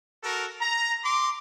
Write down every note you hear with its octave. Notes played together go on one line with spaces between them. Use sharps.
F#4 A4 A#4
A#5
C6 D6